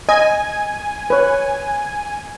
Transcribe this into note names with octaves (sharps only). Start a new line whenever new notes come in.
D#5 G#5
B4 C#5